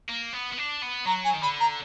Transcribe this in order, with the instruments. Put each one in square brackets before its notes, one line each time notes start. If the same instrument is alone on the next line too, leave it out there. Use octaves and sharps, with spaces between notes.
[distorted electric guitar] A#3
B3
B3
D4
B3
[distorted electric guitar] F#3 [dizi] A#5
[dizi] G#5
[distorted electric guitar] D#3
[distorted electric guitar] D3 [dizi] B5
[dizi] A#5